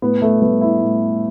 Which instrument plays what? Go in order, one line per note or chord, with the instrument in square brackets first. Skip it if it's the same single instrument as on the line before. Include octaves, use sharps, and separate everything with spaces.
[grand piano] A2 B3
A3
G3 B3
E4
A2